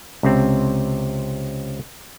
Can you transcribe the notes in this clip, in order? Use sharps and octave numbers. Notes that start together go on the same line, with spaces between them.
C#2 C3 C4